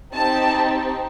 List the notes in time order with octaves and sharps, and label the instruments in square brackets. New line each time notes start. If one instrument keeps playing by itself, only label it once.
[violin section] C4 D#4 G4 A5